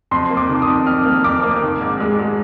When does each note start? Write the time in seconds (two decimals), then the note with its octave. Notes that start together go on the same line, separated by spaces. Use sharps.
0.11 F2 C6
0.30 A#3
0.37 D6
0.49 D#3
0.62 D#6
0.68 F2
0.87 F2 F6
1.05 A#3
1.24 F2 D6
1.44 A#3
1.62 D#3
1.81 G#2
2.00 G#3
2.19 G#3